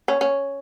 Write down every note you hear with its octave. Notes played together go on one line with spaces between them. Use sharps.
C#4
C#4